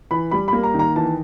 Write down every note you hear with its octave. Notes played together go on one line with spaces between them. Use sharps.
E3 B5
G3 B5
A#3 B5
A#5
D#3
A#5
E3 A5